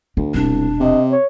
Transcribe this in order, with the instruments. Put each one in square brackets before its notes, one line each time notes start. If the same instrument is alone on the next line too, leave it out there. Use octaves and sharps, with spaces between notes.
[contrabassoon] D2 [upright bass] D4
[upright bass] E1 [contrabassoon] C2 [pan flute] D4
[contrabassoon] C3 [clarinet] D#5
[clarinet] C#5